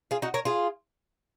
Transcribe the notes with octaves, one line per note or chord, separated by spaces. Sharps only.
F4 G#4
D#4 F#4
A#4 C#5
F4 G#4